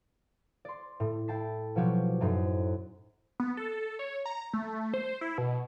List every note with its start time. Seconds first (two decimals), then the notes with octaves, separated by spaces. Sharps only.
0.65 D5 C6
1.00 A2
1.28 E4 G5 A5 C7
1.75 B2 F3 F#3 F#4 G4
2.20 F#2 A2 D#4 C5
3.40 B3
3.57 A4
3.99 C#5
4.26 A#5
4.53 A3
4.94 C5
5.21 E4
5.38 B2